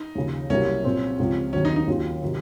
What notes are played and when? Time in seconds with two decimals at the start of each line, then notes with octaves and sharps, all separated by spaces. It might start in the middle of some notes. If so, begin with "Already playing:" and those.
Already playing: D#4
0.15 D#2 C#3 F3
0.50 C2 C3 F#3 A#3 C#4
0.84 A#2 F#3 C4
1.19 C#2 C#3 F3 C4
1.53 D#2 D#3 F#3 C4 C#4
1.65 D#4
1.76 D#4
1.88 D#2 D#3 F#3 C#4 F4
2.22 C3 D#3 F#3